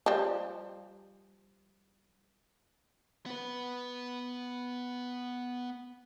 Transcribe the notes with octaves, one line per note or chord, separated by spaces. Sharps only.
F3 G3
B3 B4